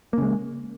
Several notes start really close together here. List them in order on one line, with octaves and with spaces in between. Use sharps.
A#3 C#3 G#3